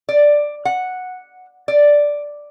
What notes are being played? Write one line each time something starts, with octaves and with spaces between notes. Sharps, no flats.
D5
F#5
D5